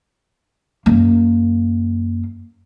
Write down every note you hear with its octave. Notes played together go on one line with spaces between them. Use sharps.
F#2 A#3